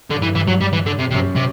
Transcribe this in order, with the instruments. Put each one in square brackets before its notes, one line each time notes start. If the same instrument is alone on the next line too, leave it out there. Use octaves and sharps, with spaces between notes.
[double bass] G2 [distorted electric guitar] D3
[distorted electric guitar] E3
E3
F#3
G3
E3
D3
C3
[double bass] F#2 [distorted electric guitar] C3
[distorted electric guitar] C3